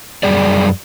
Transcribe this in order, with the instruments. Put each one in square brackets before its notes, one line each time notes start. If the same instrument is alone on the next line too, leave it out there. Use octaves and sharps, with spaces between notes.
[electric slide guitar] F#2 G3 G#4 D5